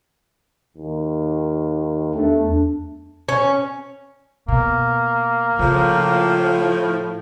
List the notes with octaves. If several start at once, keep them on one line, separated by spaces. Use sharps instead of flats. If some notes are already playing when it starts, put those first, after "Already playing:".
D#2
E2 A3 D4
C#4
B2 A#3
A2 C#3 F3